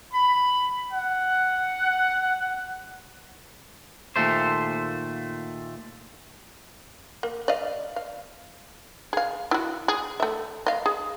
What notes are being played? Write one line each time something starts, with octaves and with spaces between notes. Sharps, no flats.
B5
F#5
D#2 A#2 A3 C5
A#3
D5 D#5 F5
F5
G#4 F5
E4 F#4
G#4
A3 E5
D#5 F5
G#4